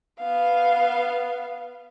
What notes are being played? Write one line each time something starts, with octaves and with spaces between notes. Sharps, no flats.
B3 F5